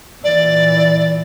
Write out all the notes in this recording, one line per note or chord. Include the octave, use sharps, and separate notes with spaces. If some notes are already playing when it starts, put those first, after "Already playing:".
A#2 E3 D5